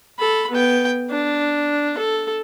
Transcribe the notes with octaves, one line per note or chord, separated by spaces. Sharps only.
A4 B5
B3 G5
D4
A4